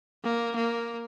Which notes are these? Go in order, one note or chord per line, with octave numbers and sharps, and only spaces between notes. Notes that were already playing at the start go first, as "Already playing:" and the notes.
A#3
A#3